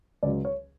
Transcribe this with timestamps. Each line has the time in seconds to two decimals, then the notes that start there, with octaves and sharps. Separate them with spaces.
0.23 C#2 C#3 F#3 D5
0.45 C#5